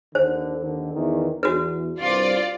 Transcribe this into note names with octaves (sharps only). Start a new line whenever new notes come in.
D#2 D3 C5
D#2 D3 D#3
E2 D#3 E3
E2 F#4 B4
C2 G2 F4 C5 D5